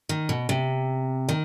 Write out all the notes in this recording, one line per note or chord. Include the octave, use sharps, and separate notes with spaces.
D#3
B2
C3
D#3